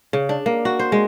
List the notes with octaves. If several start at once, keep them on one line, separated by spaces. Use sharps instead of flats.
C#3
D4
A#3
F#4
C5
G#3